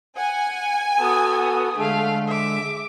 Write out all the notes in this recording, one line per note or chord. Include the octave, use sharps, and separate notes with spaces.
F#5 G#5
B3 F#4 A4 D#6
D3 G#3 A3 F5
E5 D6